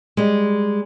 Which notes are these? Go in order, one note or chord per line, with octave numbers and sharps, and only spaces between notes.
G3 G#3